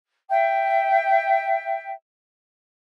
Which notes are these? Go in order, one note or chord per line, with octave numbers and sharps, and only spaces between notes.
E5 G5